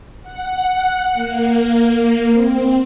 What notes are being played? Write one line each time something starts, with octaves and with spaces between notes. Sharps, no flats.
F#5
A#3
A#3
C4